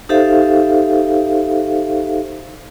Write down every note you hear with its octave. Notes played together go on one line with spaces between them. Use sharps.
D#4 G4 A4 C5 E5 F5